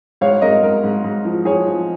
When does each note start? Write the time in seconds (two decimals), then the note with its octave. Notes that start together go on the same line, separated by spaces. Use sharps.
0.21 G#2 C#5 F5
0.41 G#2 A#4 D#5
0.63 G#2 A#4
0.84 G#2
1.04 G#2
1.25 F3
1.45 F3 G#4 C#5
1.66 F3